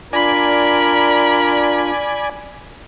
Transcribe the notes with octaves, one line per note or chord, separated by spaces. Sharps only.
D4 F4 A#4 D5 G#5 B5